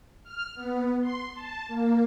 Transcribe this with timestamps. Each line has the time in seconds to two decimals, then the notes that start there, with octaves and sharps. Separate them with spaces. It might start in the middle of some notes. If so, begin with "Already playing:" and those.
0.24 F6
0.55 B3
1.01 C6
1.34 A5
1.67 A#3